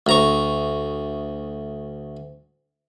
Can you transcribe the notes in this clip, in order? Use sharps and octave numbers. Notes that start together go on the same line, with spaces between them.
D2 A#5 C#6